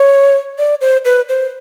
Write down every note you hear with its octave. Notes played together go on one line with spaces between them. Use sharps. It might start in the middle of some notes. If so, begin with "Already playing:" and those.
Already playing: C#5
D5
C5
B4
C5